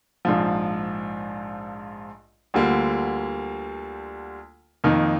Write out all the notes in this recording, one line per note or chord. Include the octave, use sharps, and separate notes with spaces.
A#1 G#2 F3
D2 D3 G3 A#3 F4
F2 D#3 A#3 D#4